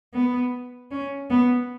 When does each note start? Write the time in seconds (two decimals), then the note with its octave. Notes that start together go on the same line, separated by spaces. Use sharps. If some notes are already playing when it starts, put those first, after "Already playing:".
0.14 B3
0.91 C#4
1.30 B3